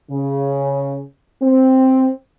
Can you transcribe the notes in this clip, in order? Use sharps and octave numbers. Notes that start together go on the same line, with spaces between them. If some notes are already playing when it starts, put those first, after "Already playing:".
C#3
C4